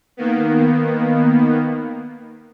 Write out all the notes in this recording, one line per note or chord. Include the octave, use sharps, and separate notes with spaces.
D#3 A#3 B3